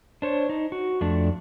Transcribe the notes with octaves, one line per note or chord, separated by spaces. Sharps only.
D4 C5 C#5
D#4
F#4
F2 A3 D4